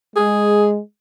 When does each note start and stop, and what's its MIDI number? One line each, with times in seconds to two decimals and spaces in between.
0.16 0.79 56
0.16 0.68 68